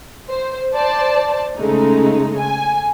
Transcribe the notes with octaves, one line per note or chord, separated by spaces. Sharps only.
C5
C5 D5 A5
C#3 G#3 A3 D#4
G#5